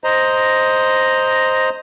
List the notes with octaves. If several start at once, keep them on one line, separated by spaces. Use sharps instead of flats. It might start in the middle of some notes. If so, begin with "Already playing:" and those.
C5 D#5 A#5